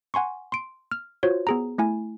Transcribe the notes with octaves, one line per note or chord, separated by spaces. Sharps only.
F#5 G#5 C6 C#6
C6 D7
F6
F4 F#4 C5 C#5
B3 G#4 A#5
A3 E4 G#5